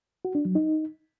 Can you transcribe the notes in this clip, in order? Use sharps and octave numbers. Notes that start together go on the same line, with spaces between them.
F#4
D4
F#3
D#4